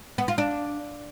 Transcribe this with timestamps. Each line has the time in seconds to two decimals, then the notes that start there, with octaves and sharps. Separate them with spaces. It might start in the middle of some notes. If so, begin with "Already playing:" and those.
0.18 B3
0.28 F4
0.38 D4